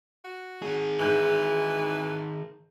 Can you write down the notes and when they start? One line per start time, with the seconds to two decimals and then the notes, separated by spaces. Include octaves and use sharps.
0.24 F#4
0.62 D#3 G#4
0.99 G#2 E3 G6 F#7